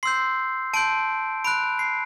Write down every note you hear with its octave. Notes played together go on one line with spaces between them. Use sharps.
C6 E6 G6 C7
A5 C6 G6 D7
B5 F#6 D7
C7